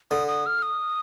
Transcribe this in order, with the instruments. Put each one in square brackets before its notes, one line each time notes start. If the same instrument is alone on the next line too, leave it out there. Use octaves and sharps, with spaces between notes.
[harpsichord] D3 [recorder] D#6
[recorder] D#6
F6
D#6